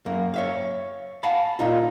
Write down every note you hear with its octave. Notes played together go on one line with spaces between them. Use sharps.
F#2 A#3
C#5 E5 F5
F5 F#5 G#5 A5 B5
A#2 A#3 D#4 F4